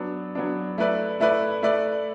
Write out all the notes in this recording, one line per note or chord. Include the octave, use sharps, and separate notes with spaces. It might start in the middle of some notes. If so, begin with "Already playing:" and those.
Already playing: F#3 B3 D4
F#3 B3 D4
A3 E4 B4 D5
A3 E4 B4 D5
A3 E4 B4 D5